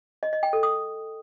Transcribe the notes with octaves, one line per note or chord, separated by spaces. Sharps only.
D#5
D#5
G5
A4
D#6